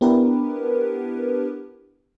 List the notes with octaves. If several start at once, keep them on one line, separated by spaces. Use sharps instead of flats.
B3 D4 E4 G4 A#4 B4